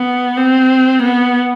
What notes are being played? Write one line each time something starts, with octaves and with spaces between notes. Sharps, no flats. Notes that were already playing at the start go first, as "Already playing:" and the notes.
Already playing: B3
C4
B3